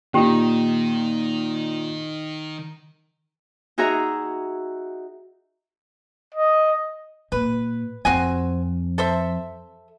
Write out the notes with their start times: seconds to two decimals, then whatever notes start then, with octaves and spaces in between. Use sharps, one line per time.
0.14 A#2 D#3 C#4 D#4 G4
3.78 D#4 F#4 G#4 E5 A#5
6.35 D#5
7.32 A#2 B4
8.05 F2 C4 F#4 G#5
8.98 A4 C5 E5